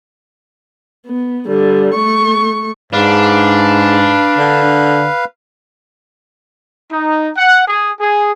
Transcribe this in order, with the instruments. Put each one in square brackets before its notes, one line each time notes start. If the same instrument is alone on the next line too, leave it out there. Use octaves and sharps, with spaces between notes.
[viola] B3
D3 G3
A3 C#6
[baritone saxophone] G#2 [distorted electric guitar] D4 [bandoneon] B4 F5
[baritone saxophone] D3
[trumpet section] D#4
F#5
G#4
G#4